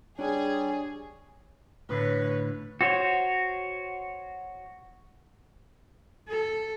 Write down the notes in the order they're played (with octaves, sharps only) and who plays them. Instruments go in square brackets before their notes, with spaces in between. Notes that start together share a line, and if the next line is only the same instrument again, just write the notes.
[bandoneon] G3 [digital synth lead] D4 [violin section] G#4 [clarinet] C#5
[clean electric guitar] A2 D3 A3 [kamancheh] B4 C#5
[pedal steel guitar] F#4 C5 C#5
[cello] A4